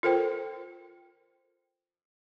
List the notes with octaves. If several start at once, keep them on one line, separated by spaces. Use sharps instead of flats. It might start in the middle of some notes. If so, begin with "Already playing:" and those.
F4 A4 A#4 C5 G5